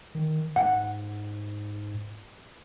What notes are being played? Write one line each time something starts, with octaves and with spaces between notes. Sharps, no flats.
D#3
G#2 F#5